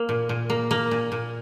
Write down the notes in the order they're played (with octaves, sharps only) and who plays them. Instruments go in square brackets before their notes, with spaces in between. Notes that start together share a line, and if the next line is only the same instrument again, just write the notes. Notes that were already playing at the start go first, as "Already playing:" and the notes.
Already playing: [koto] A#3
A#2
A#2
A#3
A#3
A#2
A#2